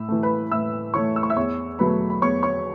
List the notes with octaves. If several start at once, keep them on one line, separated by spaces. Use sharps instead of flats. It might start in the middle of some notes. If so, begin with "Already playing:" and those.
Already playing: A2 E5 E6
E3 A3
B4 B5
A2 E5 E6
E3 A3 C#5 C#6
E6
C#6
E5 E6
E2 C#5 C#6
B2 F#3 A3 B4 B5
B5
E2 C#5 C#6
C#5 C#6